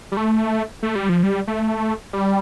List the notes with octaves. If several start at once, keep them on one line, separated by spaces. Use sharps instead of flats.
G3
A3
A3
G3
F3
G3
A3
G3